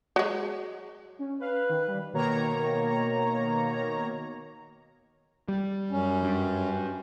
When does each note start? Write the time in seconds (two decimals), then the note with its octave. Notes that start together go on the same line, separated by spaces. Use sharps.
0.16 F#3 G#3
1.19 C#4
1.41 B4 F5
1.70 D#3
1.88 G3
2.13 B2 D#3 A#3 C#5 A#5
5.48 G3
5.91 F#2 C#4
6.23 G2